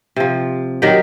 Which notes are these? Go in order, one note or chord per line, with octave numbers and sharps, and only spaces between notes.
C3 F3
D#3 F#3 G4